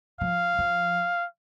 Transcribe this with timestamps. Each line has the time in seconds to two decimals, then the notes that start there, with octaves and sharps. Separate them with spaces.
0.21 F3 F5
0.58 F3